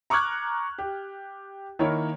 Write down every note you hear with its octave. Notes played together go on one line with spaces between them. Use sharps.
A#5 C#6 D6 F6 F#6 G#6
G4
D#3 A#3 E4 A#4 C#5